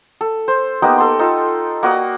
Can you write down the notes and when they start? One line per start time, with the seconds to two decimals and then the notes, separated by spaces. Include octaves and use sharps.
0.21 A4
0.48 C5
0.82 A#3 B3 D#4 G4
0.98 A4 C6
1.19 D#4 F4 A4
1.83 A#3 F#4 D5 D#6